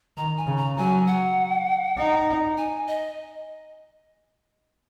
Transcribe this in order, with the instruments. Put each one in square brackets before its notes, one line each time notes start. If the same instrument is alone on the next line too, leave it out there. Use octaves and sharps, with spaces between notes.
[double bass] D#3 [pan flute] A#5
[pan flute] G#5
[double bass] C#3
[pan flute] A#5
[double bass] F#3 [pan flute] G#5
[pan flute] F#5
[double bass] D#4
[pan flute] G#5
D#5